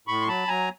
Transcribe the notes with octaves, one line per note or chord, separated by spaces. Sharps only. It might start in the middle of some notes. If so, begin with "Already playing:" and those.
A2 B5 C#6
C6
F#3 A5 B5
F#3 G#5 A#5